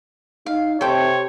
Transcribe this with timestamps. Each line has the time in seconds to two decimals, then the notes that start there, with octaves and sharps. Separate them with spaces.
0.46 D#4 F5
0.81 C3 A4 C5 C#5 G5